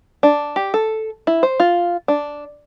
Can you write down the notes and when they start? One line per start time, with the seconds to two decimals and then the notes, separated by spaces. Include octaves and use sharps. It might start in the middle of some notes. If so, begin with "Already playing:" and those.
0.23 D4
0.56 G4
0.74 A4
1.27 E4
1.43 C5
1.60 F4
2.08 D4